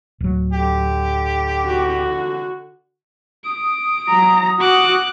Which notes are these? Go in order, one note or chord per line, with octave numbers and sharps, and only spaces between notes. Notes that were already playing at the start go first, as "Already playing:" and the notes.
D1 F#3
D3 G4
F#4
D#6 D7
F#3 A#5
F#4 D6 F#6